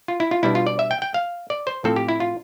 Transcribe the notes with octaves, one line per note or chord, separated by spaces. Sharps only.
F4
E4
F4
B2 G3 D4 E4
F4
D5
E5
G5
G5
F5
D5
C5
A2 F3 C4 A4
G4
E4
F4